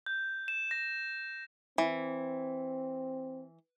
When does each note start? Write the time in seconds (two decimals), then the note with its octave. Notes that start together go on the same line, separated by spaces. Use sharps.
0.06 G6
0.48 E7
0.71 A#6
1.78 E3 C4